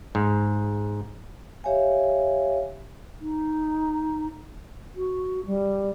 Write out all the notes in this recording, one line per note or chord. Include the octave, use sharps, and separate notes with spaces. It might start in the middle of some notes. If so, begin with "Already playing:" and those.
G#2
G4 C#5 E5 F5 G#5
D#4
F#4
G3